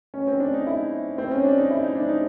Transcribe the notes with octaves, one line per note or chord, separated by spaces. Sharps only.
C#4
C4
D4
D#4
E4
C4
C#4
D4
D#4
E4
D#4
D4
D#4